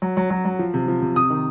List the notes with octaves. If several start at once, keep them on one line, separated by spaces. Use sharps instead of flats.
F#3
F#3
F#3
F#3
F3
C3
F3
C3
C3 D#6
D#3